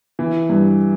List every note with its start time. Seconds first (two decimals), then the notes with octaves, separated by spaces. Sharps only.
0.19 E3
0.50 G2